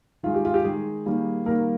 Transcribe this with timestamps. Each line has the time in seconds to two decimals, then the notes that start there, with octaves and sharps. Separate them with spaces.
0.23 D#3 G#3 F4
0.34 G4
0.45 F4
0.54 G4
0.64 D#3 G#3 G#4
1.06 D#3 G3 A#3
1.46 D#3 G3 A#3 A#4